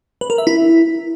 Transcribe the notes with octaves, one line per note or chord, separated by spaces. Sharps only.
B4
A#4
E5
E4